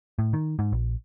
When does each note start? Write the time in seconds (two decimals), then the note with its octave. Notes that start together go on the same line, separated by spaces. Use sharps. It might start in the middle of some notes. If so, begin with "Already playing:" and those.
0.19 A2
0.33 D#3
0.59 G#2
0.72 A#1